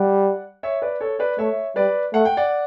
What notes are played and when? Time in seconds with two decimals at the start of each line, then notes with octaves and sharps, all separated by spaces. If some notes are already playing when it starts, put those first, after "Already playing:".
Already playing: G3 D5 F#5
0.63 C#5 E5
0.82 B4 D5
1.00 A4 C#5
1.19 B4 D5
1.38 A3 C#5 E5
1.76 G3 B4 D5
2.14 A3 F#5
2.25 G5
2.37 D5 F#5